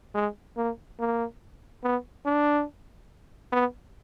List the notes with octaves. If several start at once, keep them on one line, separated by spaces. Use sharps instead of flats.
G#3
A#3
A#3
B3
D4
B3